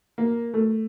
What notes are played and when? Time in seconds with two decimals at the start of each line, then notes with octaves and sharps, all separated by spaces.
0.18 A#3
0.54 A3